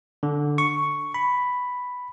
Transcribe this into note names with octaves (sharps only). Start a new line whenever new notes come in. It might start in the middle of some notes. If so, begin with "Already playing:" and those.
D3
C#6
B5